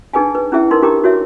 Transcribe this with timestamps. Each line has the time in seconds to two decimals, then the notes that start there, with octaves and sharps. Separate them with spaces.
0.13 D4 D#4 G#4 B4 G5 G#5
0.35 B4
0.52 C#4 E4 G#4 E5 G5
0.71 D#4 A#4 B4 C6
0.82 D4 G4 A#4 G5 A#5 D6
1.04 F#4 C#5 E5